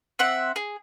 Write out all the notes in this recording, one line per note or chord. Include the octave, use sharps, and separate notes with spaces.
C4 E5 F#5
G#4